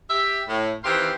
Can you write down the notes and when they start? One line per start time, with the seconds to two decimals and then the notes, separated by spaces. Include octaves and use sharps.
0.10 G4 E5
0.48 A2
0.84 D#3 E3 C4 G4 F5 C6